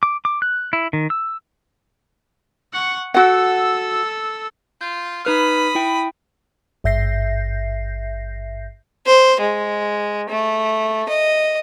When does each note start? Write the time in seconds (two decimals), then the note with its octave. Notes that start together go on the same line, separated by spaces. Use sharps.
0.03 D6
0.25 D6
0.42 F#6
0.73 E4
0.93 D#3
1.10 E6
2.73 F#5 C#6
3.14 F#4 A4 F#5 E6
4.81 F4 G6
5.25 D#4 B4 B5 D#6 F6
5.75 E4 G5
6.84 G#1 G2 E5 G6 A#6 C7
9.06 C5
9.40 G#3
10.30 A3
11.09 D#5